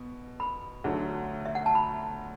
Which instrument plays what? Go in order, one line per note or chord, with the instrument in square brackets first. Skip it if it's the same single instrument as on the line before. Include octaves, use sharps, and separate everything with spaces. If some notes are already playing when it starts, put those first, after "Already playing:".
Already playing: [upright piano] B2
[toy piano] B5
[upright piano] D2 D3 F#3 A3
[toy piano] E5
F#5
A5
B5